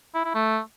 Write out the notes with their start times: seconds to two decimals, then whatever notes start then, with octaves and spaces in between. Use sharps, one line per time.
0.14 E4
0.25 E4
0.35 A3